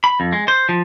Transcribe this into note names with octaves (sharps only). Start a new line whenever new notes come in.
B5
F2
G#3
C5
F3